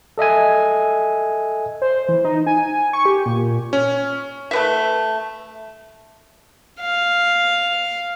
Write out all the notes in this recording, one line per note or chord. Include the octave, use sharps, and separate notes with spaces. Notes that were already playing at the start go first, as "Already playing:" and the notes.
A4 D#5 E5 G#5
C5
E3
D#4
G#5
C#6
G4
A#2
C#4
A3 B4 E5
F5